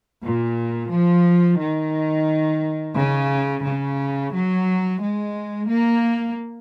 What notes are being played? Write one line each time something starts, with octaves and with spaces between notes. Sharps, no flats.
A#2
F3
D#3
C#3
C#3
F#3
G#3
A#3